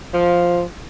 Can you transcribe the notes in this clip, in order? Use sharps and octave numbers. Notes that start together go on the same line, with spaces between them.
F3